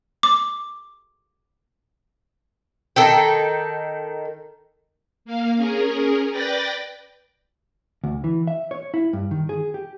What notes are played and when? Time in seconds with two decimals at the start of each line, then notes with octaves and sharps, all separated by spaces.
0.23 D6
2.96 D#3 A4 G5
5.25 A#3 F5
5.56 C#4 G#4 A#4
6.32 B4 D5 G5 B5 A6 A#6
8.04 D2
8.24 E3
8.47 E5
8.71 C#5
8.94 E4
9.13 G2
9.31 D#3
9.49 G#4
9.74 G4